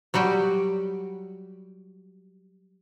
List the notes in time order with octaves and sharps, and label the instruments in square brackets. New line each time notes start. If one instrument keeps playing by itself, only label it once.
[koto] F#3 G3 F#4 G4